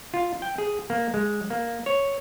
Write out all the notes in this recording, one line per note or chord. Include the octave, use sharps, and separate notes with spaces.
F4
G5
G#4
A#3
G#3
A#3
C#5